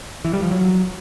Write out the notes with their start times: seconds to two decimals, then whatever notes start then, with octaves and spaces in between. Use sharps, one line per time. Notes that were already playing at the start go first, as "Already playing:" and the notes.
0.25 E3
0.33 G3
0.42 F3
0.51 F#3